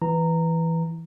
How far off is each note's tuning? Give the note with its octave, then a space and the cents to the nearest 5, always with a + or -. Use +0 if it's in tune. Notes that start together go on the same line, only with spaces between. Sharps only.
E3 +0 A#5 -15